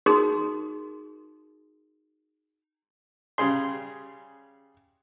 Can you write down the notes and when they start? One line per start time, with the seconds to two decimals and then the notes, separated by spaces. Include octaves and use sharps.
0.06 D#4 F#4 G#4 A#4 C6 D#6
3.38 C#3 G3 G#4 C6